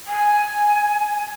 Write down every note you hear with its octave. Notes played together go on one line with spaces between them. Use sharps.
G#5